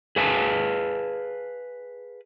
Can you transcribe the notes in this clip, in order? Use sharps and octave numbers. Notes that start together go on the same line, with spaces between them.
G#4 B4 F5 G#5 A5